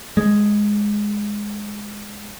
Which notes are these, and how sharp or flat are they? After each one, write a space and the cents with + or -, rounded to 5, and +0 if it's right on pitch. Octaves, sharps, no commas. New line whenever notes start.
G#3 -5